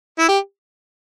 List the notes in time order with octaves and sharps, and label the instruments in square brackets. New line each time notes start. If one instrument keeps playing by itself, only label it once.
[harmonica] E4
G4